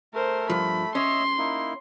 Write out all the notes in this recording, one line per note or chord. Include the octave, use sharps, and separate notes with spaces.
A3 A#4 C5
G2 F3 B5
C#4 C#5 D#5 E5 C6
A#3 D#4 E4